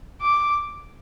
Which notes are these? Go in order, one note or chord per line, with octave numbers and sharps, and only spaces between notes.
D6